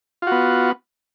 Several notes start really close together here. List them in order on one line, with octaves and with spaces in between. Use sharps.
F4 F#4 B3